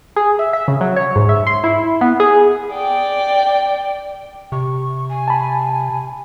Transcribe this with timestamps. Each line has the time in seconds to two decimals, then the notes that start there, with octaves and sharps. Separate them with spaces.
0.16 G#4
0.39 E5
0.53 E5
0.68 C#3
0.81 F#3
0.96 C#5
1.16 G#2
1.29 E5
1.47 C6
1.64 E4
2.01 B3
2.20 G#4
2.74 D5 G5
4.52 C3 C#6
5.10 G#5
5.28 A5 B5